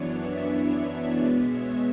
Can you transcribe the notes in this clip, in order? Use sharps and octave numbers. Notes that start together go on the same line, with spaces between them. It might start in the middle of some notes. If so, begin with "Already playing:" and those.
Already playing: F#2 E3 B3 D4 C#5
C#5 E5
C#5 E5
B2 G#3 B3 B4 D5
C#5 E5